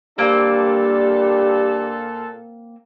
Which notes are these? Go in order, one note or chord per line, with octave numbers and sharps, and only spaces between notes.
A#2 G3 A#3 C4 D4 F4 A4